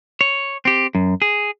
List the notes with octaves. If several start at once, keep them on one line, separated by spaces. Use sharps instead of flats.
C#5
C4 G4
F#2
G#4